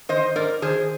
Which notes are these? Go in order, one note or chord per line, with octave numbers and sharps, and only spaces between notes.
D#3 C5 D#5
G#2 A#4 D5
D#3 G#4 C5